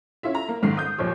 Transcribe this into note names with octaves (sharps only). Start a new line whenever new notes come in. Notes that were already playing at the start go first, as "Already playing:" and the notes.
C#4 E4 F4 E5
A#5
A#3
C#2 G#2 D#3 C7
D#6 G6
D#2 A#2 F3 C#5